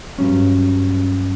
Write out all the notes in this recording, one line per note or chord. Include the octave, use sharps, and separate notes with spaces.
G2 F#3 C#4